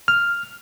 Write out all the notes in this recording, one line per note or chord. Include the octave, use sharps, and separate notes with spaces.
F6